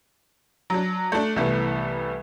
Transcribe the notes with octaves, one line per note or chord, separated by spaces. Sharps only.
F#3 D4
A3 D4
C2 E3 G3 A3 B3